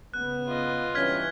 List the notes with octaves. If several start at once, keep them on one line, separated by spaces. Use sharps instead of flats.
C#3 B3 F#6
F4 D#5
G2 E3 C#4 F6 G#6 B6